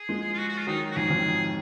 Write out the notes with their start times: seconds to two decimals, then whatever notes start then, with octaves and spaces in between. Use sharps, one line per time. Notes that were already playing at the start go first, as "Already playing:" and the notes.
Already playing: G#4
0.09 F3 G#3
0.34 F4
0.38 F#4
0.48 F#4
0.58 F4
0.67 D#3 F#3 D#4
0.91 F#4
0.96 F2 G#2 G#4
1.10 F2 G#2